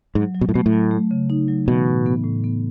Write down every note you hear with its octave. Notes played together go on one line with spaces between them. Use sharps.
G#2 F#3
F#3
B2
A2
B2 A3
A2
F#3
A3
C#3
D#4
F#3
B2 E3
A2
B3
A2
B3